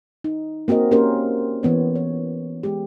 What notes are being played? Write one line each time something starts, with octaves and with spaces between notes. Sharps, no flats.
D#4
A#3 C4 F#4 A#4 D#5
A#3 C#4 G4 A#4 C5
E3 B3 C#5
C#5
G#3 G4